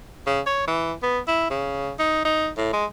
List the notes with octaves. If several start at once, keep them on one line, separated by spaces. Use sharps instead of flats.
C#3
C#5
E3
B3
E4
C#3
D#4
D#4
A2
G#3